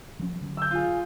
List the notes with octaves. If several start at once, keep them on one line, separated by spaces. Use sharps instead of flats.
F3 F#3 C#4
D3 F#3
E6 G6
F4 G#4